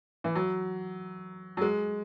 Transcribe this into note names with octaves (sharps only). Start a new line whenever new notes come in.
E3
F#3
F#3
G#3